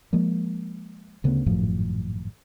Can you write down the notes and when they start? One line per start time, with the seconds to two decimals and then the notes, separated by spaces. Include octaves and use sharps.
0.13 F3 G#3 A#3
1.24 D2 C#3 A3 B3
1.46 G#1 F#2 A2 F3